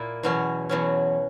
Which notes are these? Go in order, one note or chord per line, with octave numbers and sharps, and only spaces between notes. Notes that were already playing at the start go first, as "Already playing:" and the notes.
Already playing: A#2 A#3 E4
E2 B2 F#3 C#4
E2 B2 F#3 C#4